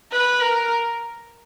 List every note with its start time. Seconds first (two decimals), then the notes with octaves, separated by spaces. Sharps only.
0.11 B4
0.40 A#4